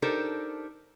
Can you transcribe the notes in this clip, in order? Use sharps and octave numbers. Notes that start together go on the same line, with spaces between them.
D4 D#4 G4 A4 A#4 C5